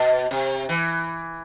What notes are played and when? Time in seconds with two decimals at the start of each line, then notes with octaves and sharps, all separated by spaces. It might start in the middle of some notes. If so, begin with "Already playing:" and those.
Already playing: B2
0.31 C3
0.69 E3